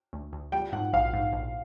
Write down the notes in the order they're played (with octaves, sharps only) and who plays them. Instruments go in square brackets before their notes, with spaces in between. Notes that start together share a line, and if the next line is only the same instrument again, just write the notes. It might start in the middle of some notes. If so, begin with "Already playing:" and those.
[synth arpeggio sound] D2
D2
[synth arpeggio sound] G3 [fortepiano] G5
[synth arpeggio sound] G#2 [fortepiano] F#5
[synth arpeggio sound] A#1 [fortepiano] F5
[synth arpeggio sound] G#2
A#1